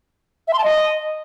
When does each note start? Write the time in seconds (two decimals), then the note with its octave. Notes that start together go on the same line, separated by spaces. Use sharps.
0.48 E5
0.53 C6
0.59 A5
0.64 D#5